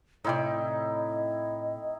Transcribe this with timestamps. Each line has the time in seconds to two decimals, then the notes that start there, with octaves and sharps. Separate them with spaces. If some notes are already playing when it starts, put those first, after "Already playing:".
0.24 A2 C3 D#4 E4 D5 D#5 G5